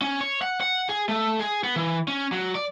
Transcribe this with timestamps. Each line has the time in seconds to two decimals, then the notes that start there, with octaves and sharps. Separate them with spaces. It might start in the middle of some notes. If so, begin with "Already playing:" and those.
0.01 C#4
0.21 C#5
0.42 F#5
0.61 F#5
0.89 G#4
1.09 A3
1.40 G#4
1.64 B3
1.76 E3
2.08 C#4
2.32 F#3
2.55 D5